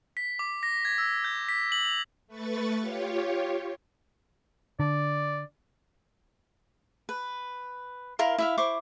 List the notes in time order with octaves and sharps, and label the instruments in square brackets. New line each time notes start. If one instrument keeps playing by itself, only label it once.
[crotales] B6
D6
A#6
G#6
E6
G6
B6
F#7
F7
[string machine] A3 B4 C#6 A6
F4 G4 C#5
[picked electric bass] D3 [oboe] D5
[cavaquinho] B4
E4 A#4 F5 C6
E4 E5 F5
E4 C5 C#6 D6